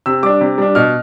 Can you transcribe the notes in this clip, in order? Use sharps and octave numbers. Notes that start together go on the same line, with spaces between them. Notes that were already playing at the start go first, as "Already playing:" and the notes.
C3 E6
G3 D4 D6
C3
G3 D4
B2 F6